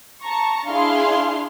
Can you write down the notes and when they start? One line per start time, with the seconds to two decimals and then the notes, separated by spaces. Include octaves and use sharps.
0.23 A5 A#5 C#6
0.68 D4 E4 G#4 F5 C6